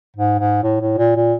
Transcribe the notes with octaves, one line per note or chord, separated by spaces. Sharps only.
G#2
G#2
A2
A2
A#2
A#2